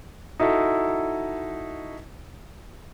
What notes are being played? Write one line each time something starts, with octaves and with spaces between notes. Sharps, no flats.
D#4 E4 F#4 A4